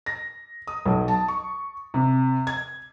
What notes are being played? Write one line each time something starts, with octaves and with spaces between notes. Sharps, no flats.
A#6
D#6
B1
A5
C#6
C3
G#6